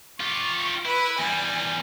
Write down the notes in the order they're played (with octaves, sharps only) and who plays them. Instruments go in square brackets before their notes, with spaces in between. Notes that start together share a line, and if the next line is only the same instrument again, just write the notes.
[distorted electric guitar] F4 G4 [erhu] C#6
[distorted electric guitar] E4 [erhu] B4
[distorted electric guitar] E2 G3 [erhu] G#5